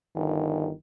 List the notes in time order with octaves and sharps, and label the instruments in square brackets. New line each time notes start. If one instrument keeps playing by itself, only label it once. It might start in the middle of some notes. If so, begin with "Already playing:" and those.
[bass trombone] G1 [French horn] D#3